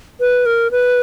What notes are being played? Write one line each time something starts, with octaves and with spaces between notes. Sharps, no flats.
B4
A#4
B4